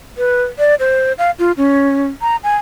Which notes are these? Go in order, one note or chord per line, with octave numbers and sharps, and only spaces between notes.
B4
D5
C5
F5
F4
C#4
A#5
G#5